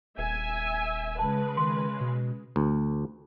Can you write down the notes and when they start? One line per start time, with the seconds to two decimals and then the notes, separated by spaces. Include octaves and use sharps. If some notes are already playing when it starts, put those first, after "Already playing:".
0.18 D#1 E5 G#5
1.19 C#3 G#3 B4 A5
1.57 D#3 C6
2.00 B2
2.56 D2